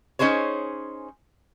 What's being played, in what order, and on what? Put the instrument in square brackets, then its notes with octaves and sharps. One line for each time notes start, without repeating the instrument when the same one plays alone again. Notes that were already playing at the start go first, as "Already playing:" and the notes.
[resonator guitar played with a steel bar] C#4 D#4 G#4 C5 C#5